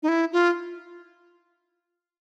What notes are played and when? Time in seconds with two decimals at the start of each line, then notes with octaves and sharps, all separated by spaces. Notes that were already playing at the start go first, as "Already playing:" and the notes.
0.03 D#4
0.08 E4
0.32 F4